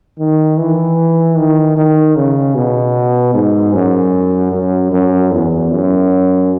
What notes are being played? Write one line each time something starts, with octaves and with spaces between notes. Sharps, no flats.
D#3
E3
D#3
D#3
C#3
B2
G#2
F#2
F#2
F#2
E2
F#2